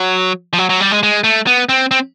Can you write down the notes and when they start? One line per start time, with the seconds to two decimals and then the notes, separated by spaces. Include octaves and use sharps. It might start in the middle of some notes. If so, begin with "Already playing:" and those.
Already playing: F#3
0.53 F3
0.58 F#3
0.69 F#3
0.80 G3
0.92 G#3
1.03 G#3
1.24 A3
1.47 B3
1.69 C4
1.91 C4